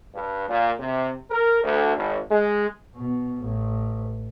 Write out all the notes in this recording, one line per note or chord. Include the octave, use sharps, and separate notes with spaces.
G2
A#2
C3
A#4
D2
G#1
G#3
B2
A1